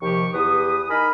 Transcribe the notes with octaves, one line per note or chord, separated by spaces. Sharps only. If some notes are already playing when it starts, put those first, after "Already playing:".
D#2 C3 F3 G4 C#6
E2 G4 B4 D#6
D#4 A#4 G#5 B5